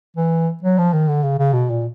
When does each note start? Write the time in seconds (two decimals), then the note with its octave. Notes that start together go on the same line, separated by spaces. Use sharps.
0.17 E3
0.63 F#3
0.78 F3
0.93 D#3
1.08 D3
1.23 C#3
1.39 C#3
1.53 B2
1.70 A#2